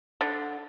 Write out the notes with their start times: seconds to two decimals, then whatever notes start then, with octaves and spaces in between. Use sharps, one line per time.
0.21 D3